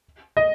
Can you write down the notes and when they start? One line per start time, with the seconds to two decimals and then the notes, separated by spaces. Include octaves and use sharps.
0.37 D#5